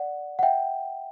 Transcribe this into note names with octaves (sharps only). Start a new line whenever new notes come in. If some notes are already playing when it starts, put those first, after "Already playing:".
Already playing: D5 F#5
F#5
E5 G5